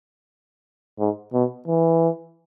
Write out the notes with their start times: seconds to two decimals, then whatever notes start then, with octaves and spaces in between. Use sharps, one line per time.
0.99 G#2
1.33 B2
1.68 E3